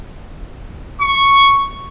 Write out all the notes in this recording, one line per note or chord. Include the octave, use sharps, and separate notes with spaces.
C#6